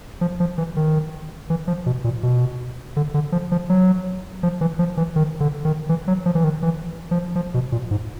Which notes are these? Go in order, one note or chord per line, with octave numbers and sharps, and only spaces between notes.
F3
F3
E3
D#3
E3
F3
B2
A#2
B2
D3
D3
F3
F3
F#3
F3
E3
F3
E3
D#3
D3
D#3
E3
F#3
F3
E3
D#3
E3
F3
F3
B2
A#2
G#2